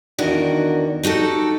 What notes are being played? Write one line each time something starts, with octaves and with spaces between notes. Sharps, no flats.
E2 D3 D#3 F#4 A#4
D#4 F#4 G4 A4